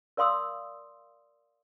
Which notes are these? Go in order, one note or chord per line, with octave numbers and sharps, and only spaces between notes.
A#4 D5 F5 C6 D#6 E6